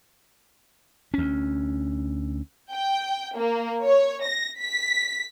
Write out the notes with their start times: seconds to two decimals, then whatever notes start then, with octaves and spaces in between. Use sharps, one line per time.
1.14 D2 C#4
2.73 G5
3.36 A#3
3.84 C#5
4.24 A#6
4.60 B6